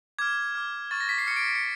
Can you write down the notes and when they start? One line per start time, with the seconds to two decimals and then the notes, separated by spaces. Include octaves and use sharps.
0.19 D6 F6 G#6
0.55 D6 F6
0.91 C#6 F6 A6
1.01 A#6
1.09 B6
1.18 C7
1.27 F6 C#7
1.31 C#6
1.36 D7
1.48 D7
1.55 C#7